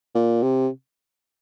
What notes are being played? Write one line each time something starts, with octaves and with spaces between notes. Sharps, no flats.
A#2
C3